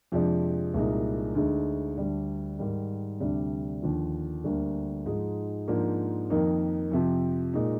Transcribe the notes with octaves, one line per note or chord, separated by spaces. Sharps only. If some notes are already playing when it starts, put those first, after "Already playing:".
F2 C3 F3 G#3 D4
C2 A#2 G#3 D#4
D2 D3 G#3 D#4
D2 D3 G3 D4
G#2 D#3 G3
D2 C3 G3 D4
D#2 D3 F3
D2 D3 G3 A#3
G#2 F3 G#3 D#4
G#2 F3 A#3 D4
F2 D#3 A#3 D#4
F2 C3 F3
A#2 G#3 D#4